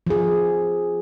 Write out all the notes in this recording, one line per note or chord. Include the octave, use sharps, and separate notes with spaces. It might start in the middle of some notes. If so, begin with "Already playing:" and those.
F3 G#4